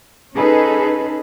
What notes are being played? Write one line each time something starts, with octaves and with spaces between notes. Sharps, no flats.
C#4 D#4 G#4 A4 B4